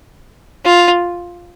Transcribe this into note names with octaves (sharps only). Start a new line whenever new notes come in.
F4